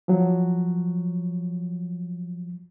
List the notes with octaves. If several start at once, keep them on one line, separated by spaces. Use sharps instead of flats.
F3 F#3